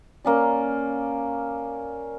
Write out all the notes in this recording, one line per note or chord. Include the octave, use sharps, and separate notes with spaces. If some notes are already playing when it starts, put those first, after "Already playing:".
A#3 C#4 D5